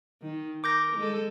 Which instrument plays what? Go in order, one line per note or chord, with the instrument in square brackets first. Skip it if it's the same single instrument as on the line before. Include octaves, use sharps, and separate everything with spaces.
[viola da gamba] D#3
[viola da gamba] A#4 [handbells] D6 G6 A#6
[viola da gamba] G#3 A4